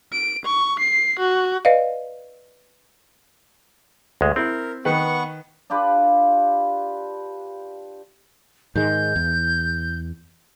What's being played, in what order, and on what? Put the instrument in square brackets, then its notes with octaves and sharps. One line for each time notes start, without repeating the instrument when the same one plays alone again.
[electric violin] D7
C#6
C7
F#4
[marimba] B4 D5 D#5 F5
[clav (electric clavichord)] D2 G#3
[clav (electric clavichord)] C4 [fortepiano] E4 [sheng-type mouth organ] A#4
[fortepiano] D#3 B4 [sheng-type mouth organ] B3 F#5 C#6
[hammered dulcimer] D4 F4 G4 B4
[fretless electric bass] G#2 D#3 G#3 [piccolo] G6
[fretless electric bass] E2